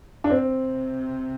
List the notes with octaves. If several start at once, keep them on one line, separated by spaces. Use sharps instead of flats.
D4
C3 C4